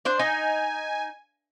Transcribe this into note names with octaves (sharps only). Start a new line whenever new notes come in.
D4 C5 D5
D#4 G#5